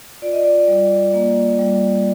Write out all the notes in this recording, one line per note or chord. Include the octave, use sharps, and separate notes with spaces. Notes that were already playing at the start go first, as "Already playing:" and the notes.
F4 D5
D#5
D5
G3
A#3
G3